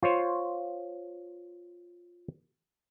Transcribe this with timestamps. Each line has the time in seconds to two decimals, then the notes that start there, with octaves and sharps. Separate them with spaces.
0.03 F4 C5 C#5